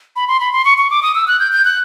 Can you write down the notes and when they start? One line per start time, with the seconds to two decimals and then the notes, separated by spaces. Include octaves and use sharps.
0.16 B5
0.28 C6
0.40 B5
0.52 C6
0.65 C#6
0.78 C#6
0.91 D6
1.03 D#6
1.15 E6
1.28 F#6
1.40 G6
1.52 G6
1.65 F#6